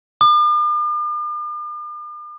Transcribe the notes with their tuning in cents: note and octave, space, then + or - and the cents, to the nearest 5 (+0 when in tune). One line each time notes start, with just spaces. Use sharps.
D6 +45